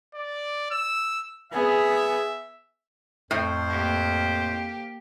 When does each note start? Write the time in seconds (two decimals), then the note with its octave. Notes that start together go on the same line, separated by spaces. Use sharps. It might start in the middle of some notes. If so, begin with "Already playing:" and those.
0.15 D5
0.71 E6
1.52 B3 G#4 E5
3.31 F2 A2 C5
3.69 A#3 G4